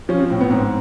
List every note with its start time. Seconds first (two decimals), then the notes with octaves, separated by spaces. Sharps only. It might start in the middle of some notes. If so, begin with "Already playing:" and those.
0.09 F3 C#4
0.19 C4
0.30 A2 C4
0.41 B3
0.50 G#2 C4